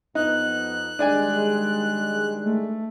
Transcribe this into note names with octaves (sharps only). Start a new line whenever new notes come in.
F2 B3 D#4 F#6
D#3 G3 G#3 D4 D5 G#5
A3